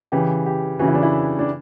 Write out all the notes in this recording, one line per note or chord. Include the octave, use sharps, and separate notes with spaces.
C#3 E3 G4
G4
C#3 E3 F#4
E4
D4
E4
D4